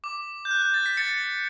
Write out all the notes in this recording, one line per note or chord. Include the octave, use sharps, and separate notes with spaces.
D6
G6
F#6
G6
A6
B6
A6 C#7